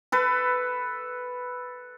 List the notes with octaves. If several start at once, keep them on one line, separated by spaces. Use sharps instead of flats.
A4 B4